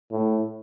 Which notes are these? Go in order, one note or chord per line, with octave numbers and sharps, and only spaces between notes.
A2